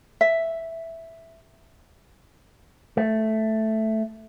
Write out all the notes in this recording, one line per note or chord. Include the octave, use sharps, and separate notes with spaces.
E5
A3